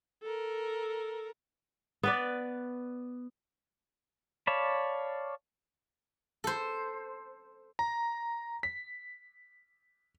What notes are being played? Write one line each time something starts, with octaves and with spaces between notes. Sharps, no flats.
A4 A#4
B3 B4 D5
C#5 D5 F5 A5 B5
A4 C5
A#5
B6